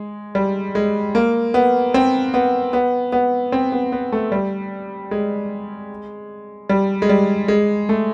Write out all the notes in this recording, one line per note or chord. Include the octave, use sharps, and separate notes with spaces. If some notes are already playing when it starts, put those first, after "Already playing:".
Already playing: G#3
G3
G#3
A#3
B3
C4
B3
B3
B3
C4
B3
B3
A3
G3
G#3
G3
G#3
G3
G#3
A3